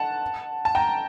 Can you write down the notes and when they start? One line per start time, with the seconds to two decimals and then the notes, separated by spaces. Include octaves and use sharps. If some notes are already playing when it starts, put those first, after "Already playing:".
Already playing: F#5 A5
0.65 A5
0.75 G5 A#5